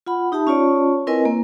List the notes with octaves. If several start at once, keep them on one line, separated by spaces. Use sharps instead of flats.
F4 F#5 B5
D#4 G4 E5 A5
C#4 F4 C#5 D5 A5
C4 E4 A#4 B4 D#5 G#5
A#3